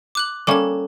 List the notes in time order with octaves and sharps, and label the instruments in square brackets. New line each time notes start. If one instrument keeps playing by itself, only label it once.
[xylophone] D6 F#6 F#7
[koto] G3 A#3 C#4 [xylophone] A4 A5